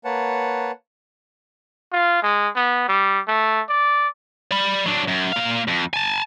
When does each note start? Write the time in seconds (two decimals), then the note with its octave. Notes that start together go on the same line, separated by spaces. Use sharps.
0.05 A#3 B4 C#5 F#5 A5
1.93 F4
2.23 G#3
2.55 B3
2.88 G3
3.28 A3
3.69 D5
4.51 D5 B5
4.86 F#3 D4
5.08 F#2
5.32 A#2 F5
5.68 F2
5.94 G#5 A5